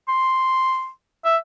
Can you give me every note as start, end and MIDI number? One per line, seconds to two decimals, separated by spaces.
0.08 0.90 84
1.25 1.37 76